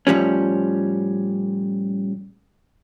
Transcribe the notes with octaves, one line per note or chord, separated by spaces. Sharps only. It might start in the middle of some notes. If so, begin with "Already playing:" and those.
A2 F3 G3 C#4